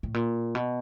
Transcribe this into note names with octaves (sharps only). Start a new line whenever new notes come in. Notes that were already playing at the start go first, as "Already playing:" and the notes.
A2
A#2
B2